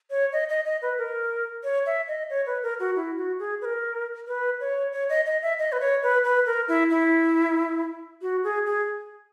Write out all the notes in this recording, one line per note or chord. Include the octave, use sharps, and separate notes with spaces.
C#5
D#5
D#5
D#5
B4
A#4
C#5
E5
D#5
C#5
B4
A#4
F#4
E4
F#4
G#4
B4
A#4
B4
C#5
C#5
D#5
D#5
E5
D#5
B4
C#5
B4
B4
A#4
E4
E4
F#4
G#4
G#4